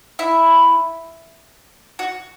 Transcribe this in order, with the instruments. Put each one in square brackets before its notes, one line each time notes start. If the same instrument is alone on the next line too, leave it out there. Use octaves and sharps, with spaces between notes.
[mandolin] E4
F#4